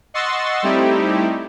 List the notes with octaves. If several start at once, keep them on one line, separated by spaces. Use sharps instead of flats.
D#5 F#5 C6 C#6 E6 A6
G3 A3 C4 D#4 E4 G4